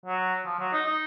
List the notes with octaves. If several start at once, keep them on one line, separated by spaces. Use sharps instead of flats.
F#3
F3
F#3
D#4
D#4